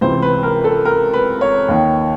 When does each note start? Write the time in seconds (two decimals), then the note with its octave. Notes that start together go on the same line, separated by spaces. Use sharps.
0.01 C#2 C3 E3 C5
0.22 B4
0.43 A#4
0.64 A4
0.85 A#4
1.14 B4
1.41 C#5
1.68 D#2 D#3